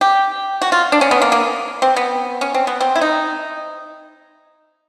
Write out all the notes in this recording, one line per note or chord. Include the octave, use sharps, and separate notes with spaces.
G4
F#4
F4
D4
C#4
B3
A#3
A#3
C4
B3
C#4
C4
B3
C4
E4
D#4